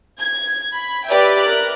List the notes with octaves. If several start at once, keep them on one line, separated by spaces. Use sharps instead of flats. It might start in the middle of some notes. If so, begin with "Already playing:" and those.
G#6
B5
G4 B4 D5 E5 G5
A#4 F#6